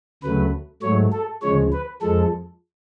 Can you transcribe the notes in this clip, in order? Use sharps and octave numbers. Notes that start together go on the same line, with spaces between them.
D2 C#3 F#3 A3 B4
G#2 F#3 A3 C#5
A4
D2 C#3 F3 G#3 C#5
B4
F2 F3 G#3 A4